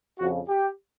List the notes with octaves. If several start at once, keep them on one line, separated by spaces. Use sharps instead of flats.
F2 C#3 F3 F#4
G4